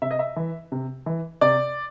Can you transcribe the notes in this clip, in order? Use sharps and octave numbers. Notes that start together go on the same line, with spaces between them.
C3 E5
D#5
E5
E3
C3
E3
C3 D5